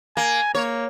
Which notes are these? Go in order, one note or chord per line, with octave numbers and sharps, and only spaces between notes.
A#3 G#5
A#3 C#5